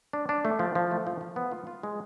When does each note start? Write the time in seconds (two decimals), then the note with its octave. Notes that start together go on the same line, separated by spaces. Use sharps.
0.13 D4
0.29 D4
0.45 A3
0.59 F3
0.75 F3
0.91 A3
1.07 F3
1.21 F3
1.36 B3
1.52 F4
1.67 F4
1.83 G#3